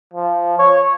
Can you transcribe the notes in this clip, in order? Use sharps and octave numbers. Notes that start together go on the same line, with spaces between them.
F3
C#5